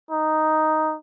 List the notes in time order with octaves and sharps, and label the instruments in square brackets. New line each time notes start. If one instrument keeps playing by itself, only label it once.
[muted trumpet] D#4